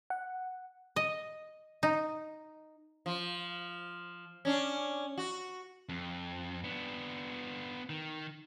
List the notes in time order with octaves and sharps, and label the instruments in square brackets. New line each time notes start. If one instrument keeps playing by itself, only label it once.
[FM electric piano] F#5
[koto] D#5
D#4
[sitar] F3
C#4 D4
F#4
[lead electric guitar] F2
B3 D4
D#3